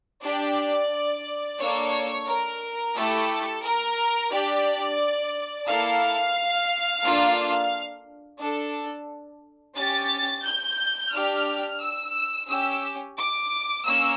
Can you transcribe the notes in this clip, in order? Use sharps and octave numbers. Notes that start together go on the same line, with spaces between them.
D4 G4 D5
A#3 D4 A4 C#5
A#4
A3 E4 G4 A4
A#4
D4 G4 D5
A#3 E4 A4 F5
A#3 D4 F4 A4
D4 A4
C#4 G4 A6
G6
D4 G4 F6
E6
C#4 G4 E6
D6
A#3 C#4 E6